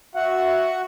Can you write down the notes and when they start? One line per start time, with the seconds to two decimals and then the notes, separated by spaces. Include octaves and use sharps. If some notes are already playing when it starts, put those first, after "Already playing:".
0.15 F#4 E5 F#5